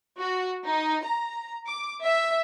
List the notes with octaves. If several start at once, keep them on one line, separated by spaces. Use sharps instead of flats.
F#4
D#4
A#5
D6
E5